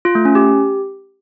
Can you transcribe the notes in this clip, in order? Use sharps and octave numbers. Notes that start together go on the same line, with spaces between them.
F4
A3
C#4
G4